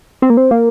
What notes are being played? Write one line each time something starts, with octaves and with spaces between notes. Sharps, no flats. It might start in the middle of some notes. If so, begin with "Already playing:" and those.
C4
A#3
C4
A#3